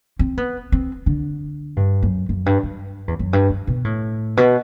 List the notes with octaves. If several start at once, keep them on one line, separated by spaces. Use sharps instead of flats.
C4
B3
C4
D3
G2
F#2
F#2
G2
G2
E2
F#2
G2
G2
B2
A2
B2